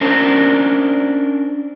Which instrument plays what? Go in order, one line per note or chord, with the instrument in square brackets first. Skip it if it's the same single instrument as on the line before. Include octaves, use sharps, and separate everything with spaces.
[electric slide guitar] C#4 D4 A#4 C5 D5